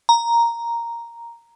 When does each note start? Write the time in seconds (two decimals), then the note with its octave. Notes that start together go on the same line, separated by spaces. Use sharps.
0.09 A#5